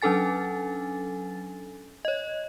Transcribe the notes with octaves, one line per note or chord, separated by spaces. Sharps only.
F#3 C#4 D4 A4 G#5 A6
C#5 D#5